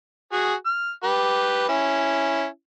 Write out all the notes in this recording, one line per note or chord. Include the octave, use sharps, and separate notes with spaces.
F#4 G#4
F6
G4 B4
C#4 E4